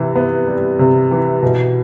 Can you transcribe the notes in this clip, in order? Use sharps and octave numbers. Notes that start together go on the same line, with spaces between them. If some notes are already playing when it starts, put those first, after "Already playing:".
Already playing: C3 E3
B3
G3
C3
E3
B2